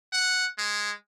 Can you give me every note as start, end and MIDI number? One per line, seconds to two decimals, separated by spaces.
0.13 0.46 78
0.58 0.92 56